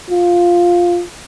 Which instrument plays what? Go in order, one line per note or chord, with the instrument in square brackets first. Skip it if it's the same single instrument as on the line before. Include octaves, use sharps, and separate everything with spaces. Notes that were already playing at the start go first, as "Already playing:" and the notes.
[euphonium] F4